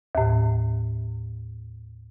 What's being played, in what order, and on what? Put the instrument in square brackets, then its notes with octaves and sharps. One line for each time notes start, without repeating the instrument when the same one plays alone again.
[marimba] D#2 A2